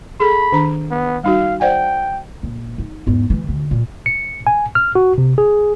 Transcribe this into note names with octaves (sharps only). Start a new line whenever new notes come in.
G#4 A4 B5
D#3 D4 A#5
B3
G3 D#4 F#4 F5
C5 D5 F#5 G5
A#1
D#4
E2 G#2
E3 A3
D2
A#2
C#7
G#5
F6
F#4
C3
G#4